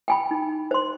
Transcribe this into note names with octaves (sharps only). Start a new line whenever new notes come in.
G5 G#5 B5
D#4
C5 C6